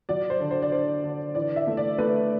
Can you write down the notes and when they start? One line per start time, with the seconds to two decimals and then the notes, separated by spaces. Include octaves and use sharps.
0.09 F#3 D5
0.30 C5
0.40 D3
0.51 C5
0.62 D5
0.72 D3 C5
1.04 D3
1.35 E3 D5
1.56 E5
1.67 A3
1.77 D5
1.98 A3 B4